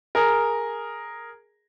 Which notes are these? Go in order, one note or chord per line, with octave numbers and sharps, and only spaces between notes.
G#4 A#4